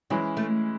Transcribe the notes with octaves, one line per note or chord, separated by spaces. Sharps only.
E3 F#3 G#3 C#4 E4 G#4
A3